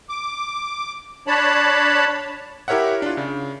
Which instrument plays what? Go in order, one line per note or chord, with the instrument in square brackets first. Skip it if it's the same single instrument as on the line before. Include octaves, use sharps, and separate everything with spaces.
[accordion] D6
D4 C#5 A5 B5
[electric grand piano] E4 G4 A#4 C#5 E5 F#5
D4 F4
C#3